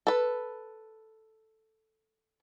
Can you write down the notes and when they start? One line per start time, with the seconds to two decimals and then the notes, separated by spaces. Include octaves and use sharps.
0.07 A4 B4